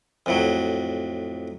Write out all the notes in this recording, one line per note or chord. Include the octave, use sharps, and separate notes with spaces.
F2 A2 F#3